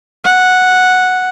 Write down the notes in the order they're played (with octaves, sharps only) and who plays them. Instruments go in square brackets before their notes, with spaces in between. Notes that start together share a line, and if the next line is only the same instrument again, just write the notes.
[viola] F#5